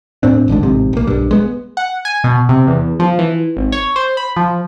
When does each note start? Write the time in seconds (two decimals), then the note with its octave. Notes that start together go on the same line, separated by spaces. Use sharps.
0.23 A2 C4 D4
0.48 D1 G#1 G#2 D3
0.63 A1 G#2 C3
0.93 B1 A#3
1.07 B1 G2
1.31 G#3 B3
1.77 F#5
2.05 G#5
2.24 B2
2.49 C3
2.67 E2
3.00 F3
3.19 E3
3.57 G#1
3.72 C#5
3.96 C5
4.17 B5
4.36 F3